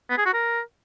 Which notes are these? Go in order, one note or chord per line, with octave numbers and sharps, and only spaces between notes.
B3
G#4
F#4
A#4